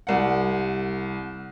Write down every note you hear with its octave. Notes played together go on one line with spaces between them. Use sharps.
C2 F#5